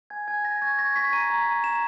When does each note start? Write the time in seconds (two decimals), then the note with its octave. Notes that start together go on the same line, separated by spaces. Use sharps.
0.10 G#5 G#6
0.28 G#5 G#6
0.45 G#5 A#6
0.62 C#6 G#6
0.78 C#6 A#6
0.96 C#6 B6
1.13 A#5 D#7
1.30 A#5
1.47 A#5
1.64 A#5 E7